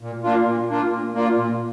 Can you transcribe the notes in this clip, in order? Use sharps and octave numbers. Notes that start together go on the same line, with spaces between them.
A#2
A#3 D4 F4
A#2
A#3 D4 F4
A#2
A#3 D4 F4
A#2